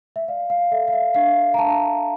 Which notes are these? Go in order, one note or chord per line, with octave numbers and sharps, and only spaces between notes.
E5
D5 F5
F5
A4 E5
F5
E5
D4 F5
A#5
D4 A5